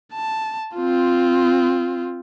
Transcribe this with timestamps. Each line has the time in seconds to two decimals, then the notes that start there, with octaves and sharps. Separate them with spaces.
0.13 A5
0.76 C4 F4